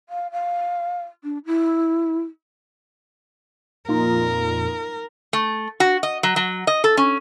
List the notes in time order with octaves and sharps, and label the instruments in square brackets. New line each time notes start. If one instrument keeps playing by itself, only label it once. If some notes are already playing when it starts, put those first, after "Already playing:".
[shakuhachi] F5
F5
D4
E4
[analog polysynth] F2 A#2 [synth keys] A#3 D#4 F4 [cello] A#4
[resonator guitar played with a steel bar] A3
F#4
D#5
F#3
F#3
D#5
A4
C#4